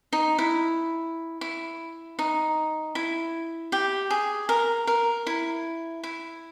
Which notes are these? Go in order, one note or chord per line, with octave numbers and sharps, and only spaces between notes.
D#4
E4
E4
D#4
E4
G4
G#4
A#4
A#4
E4
E4